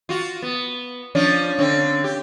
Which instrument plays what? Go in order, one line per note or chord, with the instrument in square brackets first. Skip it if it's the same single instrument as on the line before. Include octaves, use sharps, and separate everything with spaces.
[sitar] F4 F#4
B3
F3 C#4 D4
D3 C4 C#4
G4